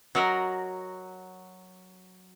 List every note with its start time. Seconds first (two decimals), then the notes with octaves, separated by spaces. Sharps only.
0.15 F#3 F#4 A#4 D#5